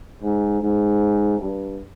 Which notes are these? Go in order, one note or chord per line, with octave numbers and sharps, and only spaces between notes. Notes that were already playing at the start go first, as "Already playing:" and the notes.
G#2
G#2
G2